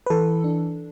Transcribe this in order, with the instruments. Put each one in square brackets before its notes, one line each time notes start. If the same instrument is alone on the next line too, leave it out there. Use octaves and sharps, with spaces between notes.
[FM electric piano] B4
E3 A4
D4